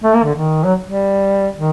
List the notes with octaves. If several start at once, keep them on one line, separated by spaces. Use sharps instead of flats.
A3
A#3
D3
D#3
F#3
G3
D#3